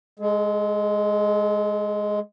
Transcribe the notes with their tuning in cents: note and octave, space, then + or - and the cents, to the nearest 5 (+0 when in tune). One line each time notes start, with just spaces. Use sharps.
G#3 +0 A4 -45